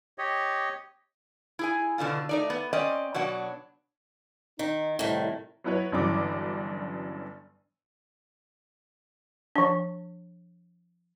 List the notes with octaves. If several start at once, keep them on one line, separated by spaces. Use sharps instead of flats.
G4 C#5 D#5
E4 G#4 G#5
B2 D3 D4 F4
A3 D#4 D5
B3
C4 C#4 D5 D#5
B2 F#3 D4 F#5
D#3 D#4
C2 A2 D#3
F#3 B3 E4 B4 C#5
G1 G2 C#3 E3 F#3 D6
F3 D4